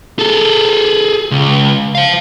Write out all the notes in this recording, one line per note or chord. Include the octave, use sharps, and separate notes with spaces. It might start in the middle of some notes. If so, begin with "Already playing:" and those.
G#4 A4
C#2
C5 F5